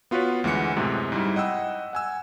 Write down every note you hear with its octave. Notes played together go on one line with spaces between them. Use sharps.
B3 F4 F#4 B4 C#5
D2 E3 G#3 F#5 F#6 C#7
F#2 A2 C3 G#3
G#2 G3 E4
D#5 F#5 G5 E6
F#5 G#5 E6